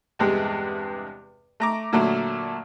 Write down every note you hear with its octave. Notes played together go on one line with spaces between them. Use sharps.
E2 G2 C3 G#3
A3 A#5 D6
A#2 D3 F#3 A3